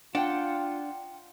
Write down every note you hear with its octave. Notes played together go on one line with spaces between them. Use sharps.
D4 F4 F#5 G5